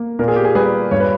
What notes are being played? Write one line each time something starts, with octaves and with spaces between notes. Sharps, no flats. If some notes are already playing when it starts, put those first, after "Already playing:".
Already playing: A#3
A#2 A#4
G#4
G4
G#4
G3 G#4 B4
G2 C#5
B4